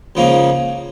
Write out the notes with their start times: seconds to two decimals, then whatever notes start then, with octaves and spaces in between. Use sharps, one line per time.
0.15 C#2 C#3 F3 A#3 D#4